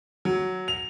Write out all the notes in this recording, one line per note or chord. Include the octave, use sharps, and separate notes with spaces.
F#3
F7